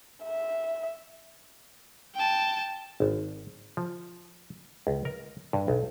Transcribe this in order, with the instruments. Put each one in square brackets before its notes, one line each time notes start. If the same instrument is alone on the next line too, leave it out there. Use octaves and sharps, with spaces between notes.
[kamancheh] E5
[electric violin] G5 A5
[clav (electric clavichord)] G#1
F3
C#2
A#4
G2
B1